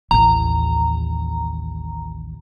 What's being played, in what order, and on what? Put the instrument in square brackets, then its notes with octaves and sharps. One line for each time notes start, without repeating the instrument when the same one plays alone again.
[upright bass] A1 D#2 [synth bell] A#5